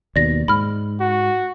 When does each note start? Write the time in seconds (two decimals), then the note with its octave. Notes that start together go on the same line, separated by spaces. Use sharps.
0.16 D#2 B2 D5 A#6
0.48 G#2 B5 F6
1.01 F#4